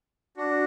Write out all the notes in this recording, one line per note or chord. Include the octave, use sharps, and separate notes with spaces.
D4 F#4